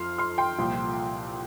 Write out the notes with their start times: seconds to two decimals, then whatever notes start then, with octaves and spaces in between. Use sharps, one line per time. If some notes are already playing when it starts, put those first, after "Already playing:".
Already playing: F2 F3 C6 F6
0.18 C6 F6
0.38 G5 C6
0.59 C2 A#2 F3